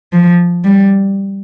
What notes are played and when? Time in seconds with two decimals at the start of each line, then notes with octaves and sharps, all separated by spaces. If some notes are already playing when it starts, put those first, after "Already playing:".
0.13 F3
0.65 G3